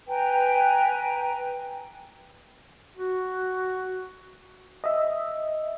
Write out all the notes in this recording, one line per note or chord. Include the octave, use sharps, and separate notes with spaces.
B4 G5 G#5 A#5
F#4
D#5 E5